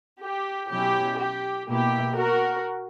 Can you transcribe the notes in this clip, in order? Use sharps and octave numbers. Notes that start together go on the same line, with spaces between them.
G4
B2 F#3 C#4 E4 G4
G4
B2 A#3 E4 G4
F#4 A#4